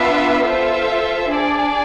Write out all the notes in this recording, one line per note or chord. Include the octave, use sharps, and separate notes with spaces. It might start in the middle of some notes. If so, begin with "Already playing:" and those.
Already playing: B3 D4 F4 B4 E5
F4 A4 C5 E5
D4 G#4 D5